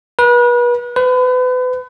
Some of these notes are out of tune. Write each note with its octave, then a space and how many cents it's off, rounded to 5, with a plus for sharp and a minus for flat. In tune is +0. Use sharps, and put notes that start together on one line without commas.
B4 -35
B4 +35